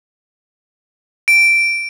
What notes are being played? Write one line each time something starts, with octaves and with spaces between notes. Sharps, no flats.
D7